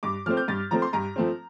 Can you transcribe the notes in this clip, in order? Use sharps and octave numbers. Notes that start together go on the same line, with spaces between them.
G2 D6
F3 A3 C4 F6
G6
G2 A6
F3 A3 C4 A#5
C6
G2 A#5
F3 A3 C4